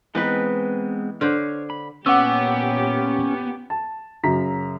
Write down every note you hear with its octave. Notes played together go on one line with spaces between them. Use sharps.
E3 G#3 B3 C4 D#4 B4
D3 C5 C#5 F6
B5
A#2 B3 C#4 G4 F#5 D6 E6
A5
F#2 C#3 A#5 B6